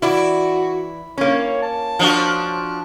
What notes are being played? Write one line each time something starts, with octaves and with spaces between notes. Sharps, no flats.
E3 E4 F#4 D5
A#3 C#4 C#5
A5
F3 D4 F#4